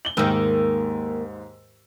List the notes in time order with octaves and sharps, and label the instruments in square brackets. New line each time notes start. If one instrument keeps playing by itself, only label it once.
[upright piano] F#7 G7
[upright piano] D#2 G#2 E6 [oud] D#3 A#3